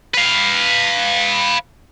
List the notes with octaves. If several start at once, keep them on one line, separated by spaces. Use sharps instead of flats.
B4 F5